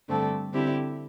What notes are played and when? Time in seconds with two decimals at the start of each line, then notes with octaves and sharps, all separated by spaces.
0.09 G2 D3 A3 C4 A4
0.53 D3 C4 E4 G4